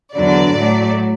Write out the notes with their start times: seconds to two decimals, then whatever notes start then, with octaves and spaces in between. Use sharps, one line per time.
0.13 E2 D3 F#3 D5
0.53 A2 F#3 A3